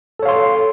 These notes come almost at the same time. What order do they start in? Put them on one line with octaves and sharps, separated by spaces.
A4 C#5 F5 C6